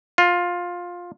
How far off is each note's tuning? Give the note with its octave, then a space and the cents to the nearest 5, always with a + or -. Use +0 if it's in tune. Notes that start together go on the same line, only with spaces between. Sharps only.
F4 +15